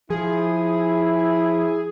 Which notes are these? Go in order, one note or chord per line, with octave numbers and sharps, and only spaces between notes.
F3 E4 G#4